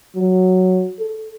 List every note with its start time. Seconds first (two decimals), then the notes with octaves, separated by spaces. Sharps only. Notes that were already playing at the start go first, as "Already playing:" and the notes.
0.16 F#3
0.99 A4